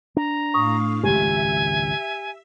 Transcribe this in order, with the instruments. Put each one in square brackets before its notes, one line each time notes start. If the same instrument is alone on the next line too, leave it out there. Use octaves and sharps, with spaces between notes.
[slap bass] D4 [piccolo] A#5
[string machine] A2 F5 [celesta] C#6 D#6
[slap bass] G#1 C#2 F#2 [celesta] G4 [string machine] E5 [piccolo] G#5